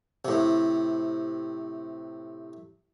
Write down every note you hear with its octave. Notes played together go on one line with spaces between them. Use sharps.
A2 C3